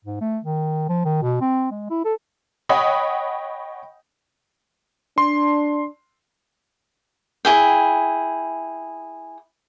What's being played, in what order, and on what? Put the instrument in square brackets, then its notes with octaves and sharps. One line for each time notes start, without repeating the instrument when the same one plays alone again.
[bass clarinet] G#2
A3
D#3
F3
D#3
B2
C4
G#3
E4
A4
[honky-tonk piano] C#5 D#5 F#5 G5 B5 D#6
[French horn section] D4 [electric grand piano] C6
[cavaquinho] E4 G#4 G5